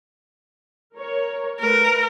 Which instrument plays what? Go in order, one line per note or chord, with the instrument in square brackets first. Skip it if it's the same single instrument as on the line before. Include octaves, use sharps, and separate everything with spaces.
[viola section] A#4 C#5
[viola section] A3 B4 [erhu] A#4